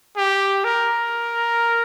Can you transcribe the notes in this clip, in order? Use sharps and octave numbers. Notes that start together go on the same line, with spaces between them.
G4
A#4